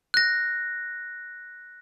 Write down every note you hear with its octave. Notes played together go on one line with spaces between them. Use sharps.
F#6 A#6